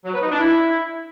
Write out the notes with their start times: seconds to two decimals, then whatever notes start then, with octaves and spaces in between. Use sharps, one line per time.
0.05 F#3
0.13 B4
0.22 D#4
0.31 D4
0.39 E4